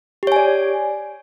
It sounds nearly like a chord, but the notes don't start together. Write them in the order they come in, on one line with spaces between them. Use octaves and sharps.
G4 C#5 G#5 D5